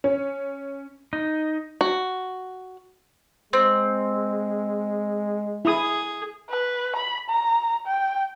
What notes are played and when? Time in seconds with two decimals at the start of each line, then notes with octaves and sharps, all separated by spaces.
0.04 C#4
1.13 D#4
1.81 F#4
3.53 G#3 C4
5.65 E4 G#4 D#6
6.49 B4
6.96 B5
7.29 A#5
7.87 G5